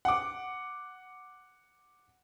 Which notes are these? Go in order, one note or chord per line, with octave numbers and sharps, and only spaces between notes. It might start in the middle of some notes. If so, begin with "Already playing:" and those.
F#5 D6